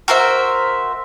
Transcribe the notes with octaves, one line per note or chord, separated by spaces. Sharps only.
F#4 A#4 C5 E5